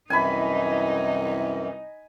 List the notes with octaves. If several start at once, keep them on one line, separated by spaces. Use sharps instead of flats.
C2 F#2 E3 D#4 G#5 B5